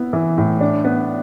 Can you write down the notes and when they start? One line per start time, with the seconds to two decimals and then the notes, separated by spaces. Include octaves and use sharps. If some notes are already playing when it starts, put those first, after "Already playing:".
Already playing: B3 E4
0.13 E3
0.38 A2
0.60 D4
0.84 B3